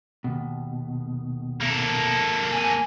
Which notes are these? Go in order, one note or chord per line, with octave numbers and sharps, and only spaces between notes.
D#2 B2
A#3 A4
G#5